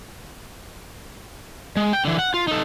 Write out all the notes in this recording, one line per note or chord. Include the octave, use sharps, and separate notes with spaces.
G#3
G5
D3 E3
F#5
F4
D#4 A4